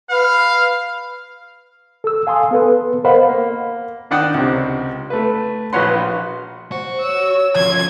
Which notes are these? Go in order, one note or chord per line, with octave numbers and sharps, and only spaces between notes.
B4 F5
A4 E6
F5 G#5 A5 C6 D#6
B3 A4 B4
A#4 C5 D#5 F5 F#5 B5
A#3
D#3 D4 D5 F#5 G5 D#6
C#2 C3
A3 B4
A#1 F#4 B4 C#5 F#5 C6
F#4 C5
C#5 E6
F3 C#4 G#6